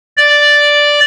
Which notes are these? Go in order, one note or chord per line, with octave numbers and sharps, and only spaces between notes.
D5